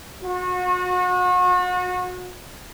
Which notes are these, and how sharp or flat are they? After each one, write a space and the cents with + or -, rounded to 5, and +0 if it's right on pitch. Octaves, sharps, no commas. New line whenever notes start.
F#4 -35